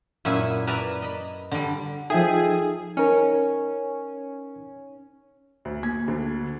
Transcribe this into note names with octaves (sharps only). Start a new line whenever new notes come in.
F#2 A#2 E4 E5 F#5 G#5
A#4 B4 D5 E5 G#5 A#5
D#5 B5
D3 G3
F3 D#4 G#4 A4 E5 G5
C#4 D#4 A#4
D2
A#3 G#6
D2 D3